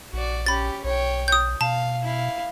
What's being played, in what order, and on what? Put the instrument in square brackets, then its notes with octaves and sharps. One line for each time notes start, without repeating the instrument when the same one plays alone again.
[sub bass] A#1 [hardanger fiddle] F#4 D5
[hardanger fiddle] C#4 G4 [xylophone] B5 A6
[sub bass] B1 [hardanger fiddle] C#5 G5
[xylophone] D#6 G6
[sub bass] B2 [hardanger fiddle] F5 [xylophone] A5
[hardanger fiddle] E4 F5